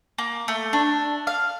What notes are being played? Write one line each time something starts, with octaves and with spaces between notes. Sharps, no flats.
A#3
A3
D4
F5